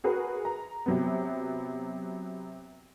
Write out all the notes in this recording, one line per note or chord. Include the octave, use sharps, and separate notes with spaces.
F#4 G#4 A#4 B4
A#5
C3 F#3 B3